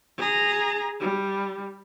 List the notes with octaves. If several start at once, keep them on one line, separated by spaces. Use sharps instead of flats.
G#4 A#5
G3